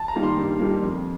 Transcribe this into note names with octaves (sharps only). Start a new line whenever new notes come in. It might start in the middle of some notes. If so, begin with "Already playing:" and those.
Already playing: A5
A#5
D#3 G3 A#3
C6
G2
D#3 G3 A#3
F2